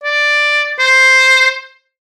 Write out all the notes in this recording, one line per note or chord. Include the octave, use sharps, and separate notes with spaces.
D5
C5